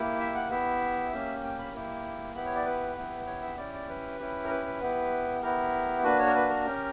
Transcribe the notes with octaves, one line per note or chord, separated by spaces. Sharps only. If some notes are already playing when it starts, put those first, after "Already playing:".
Already playing: A#3 E4 G4
E5
F#5
B3 E4 G4 E5
A#3 C#4 G4
G5
B5
A#3 E4 G4
B3 E4 G4 B5
C#5
D5
B4
B3 E4 G4
C#5
E5
C#4 E4 G4 D5
D5
B4
C#4 E4 G4
A#4
B4
B4
B3 E4 G4
B3 E4 G4 A#4
A#3 D4 F#4 B4
C#5
A#4
B4
A#4
C#4 G4